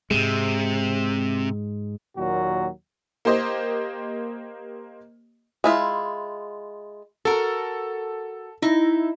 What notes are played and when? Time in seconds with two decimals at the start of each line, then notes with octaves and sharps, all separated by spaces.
0.11 G#2 C3 G#3
2.17 D#2 A#2 F#3 F#4
3.25 A#3 G4 C5 D#5
5.64 G#3 E4 F4
7.25 F#4 A4 A#4
8.62 D#4 E4